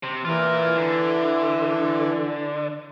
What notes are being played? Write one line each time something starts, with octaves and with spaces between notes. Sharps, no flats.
C3
E3 F4 A#4
D3